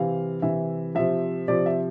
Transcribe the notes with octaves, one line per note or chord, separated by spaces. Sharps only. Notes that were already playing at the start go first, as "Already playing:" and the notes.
Already playing: C3 E3 F5
C3 E3 E5
C3 F3 E5
C3 F3 D5
E5